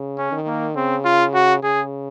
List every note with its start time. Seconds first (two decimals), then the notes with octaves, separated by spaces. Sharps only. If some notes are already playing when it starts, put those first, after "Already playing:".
Already playing: C#3
0.18 C#4
0.32 D#3
0.47 A#3
0.76 C#3 C4
1.05 F4
1.34 F#4
1.63 C#3 G#4